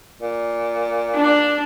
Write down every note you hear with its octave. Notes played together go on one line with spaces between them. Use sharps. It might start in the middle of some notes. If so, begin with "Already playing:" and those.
A#2
D4